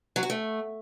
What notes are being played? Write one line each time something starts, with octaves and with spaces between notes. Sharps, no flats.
F#3
F#4
A3